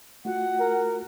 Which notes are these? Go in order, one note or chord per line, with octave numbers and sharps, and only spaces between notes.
A3 F4 F#4 F#5
A#4